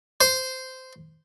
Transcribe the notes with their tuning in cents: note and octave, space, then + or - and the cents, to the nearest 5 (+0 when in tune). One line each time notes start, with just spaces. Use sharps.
C5 -10